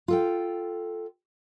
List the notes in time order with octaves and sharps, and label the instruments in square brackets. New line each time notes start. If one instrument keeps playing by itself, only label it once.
[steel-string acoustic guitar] F4 A4 G5